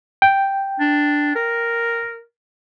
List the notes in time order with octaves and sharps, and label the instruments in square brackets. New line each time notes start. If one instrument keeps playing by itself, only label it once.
[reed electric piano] G5
[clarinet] D4
A#4